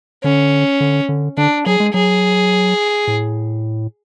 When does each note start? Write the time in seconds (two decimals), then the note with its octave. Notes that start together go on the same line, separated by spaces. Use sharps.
0.24 D3 C#4
0.80 D3
1.09 D3
1.37 D3 D4
1.66 F#3 G#4
1.80 G#3
1.94 F#3 G#4
3.08 A2